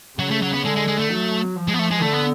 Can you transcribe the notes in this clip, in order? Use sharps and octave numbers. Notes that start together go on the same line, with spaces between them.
C#3 F#3
A3
F#3
B3
D3 G#3
G#3
G#3
A3
F#3
F3
G#3
B3
A3
G#3
D3 A3
B3